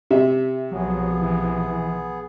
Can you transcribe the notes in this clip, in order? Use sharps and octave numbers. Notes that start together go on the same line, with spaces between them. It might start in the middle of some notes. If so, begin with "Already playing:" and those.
C3 E5
B1 F3 F#3 B3 G#4
E3